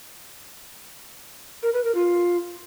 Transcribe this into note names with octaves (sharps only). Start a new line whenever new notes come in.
A#4
B4
A#4
F4